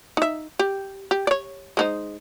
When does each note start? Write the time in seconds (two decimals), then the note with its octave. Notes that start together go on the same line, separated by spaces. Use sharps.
0.17 D#4 E5
0.59 G4
1.11 G4
1.27 C#5 D5
1.77 G#3 D#4 C5